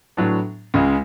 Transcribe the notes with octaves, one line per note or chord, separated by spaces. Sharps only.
A2 F#3 B3 D4
C#2 C#3 G#3